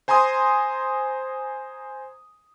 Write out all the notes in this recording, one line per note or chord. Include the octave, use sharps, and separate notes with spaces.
C5 G#5 A#5 C6 D#6